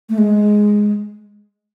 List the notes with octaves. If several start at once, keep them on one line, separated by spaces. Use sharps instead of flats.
A3
G#3